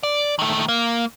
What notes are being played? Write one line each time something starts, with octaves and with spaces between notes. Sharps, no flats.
D5
D#3 A3
A#3